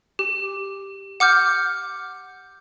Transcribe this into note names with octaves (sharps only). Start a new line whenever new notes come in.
G4
F#5 D6 F6 G6